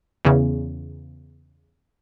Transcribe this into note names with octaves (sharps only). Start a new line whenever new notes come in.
E2 C#3